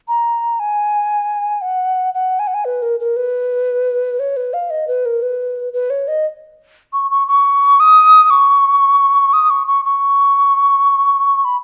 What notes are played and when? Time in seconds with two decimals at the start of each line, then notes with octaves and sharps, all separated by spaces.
0.08 A#5
0.60 G#5
1.62 F#5
2.14 F#5
2.39 G#5
2.47 F#5
2.54 G#5
2.65 B4
2.82 A#4
3.00 A#4
3.16 B4
4.19 C#5
4.37 B4
4.54 F5
4.70 D#5
4.88 B4
5.06 A#4
5.22 B4
5.73 B4
5.90 C#5
6.08 D#5
6.93 C#6
7.11 C#6
7.28 C#6
7.80 D#6
8.30 C#6
9.33 D#6
9.50 C#6
9.67 C#6
9.85 C#6
11.45 B5